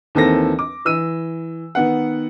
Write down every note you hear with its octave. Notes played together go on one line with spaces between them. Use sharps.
D#2 E3 C4 A4 A#4 A#6
D6
E3 E6 D#7
D#3 B3 F#5